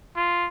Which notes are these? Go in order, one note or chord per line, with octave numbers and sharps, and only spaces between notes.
F4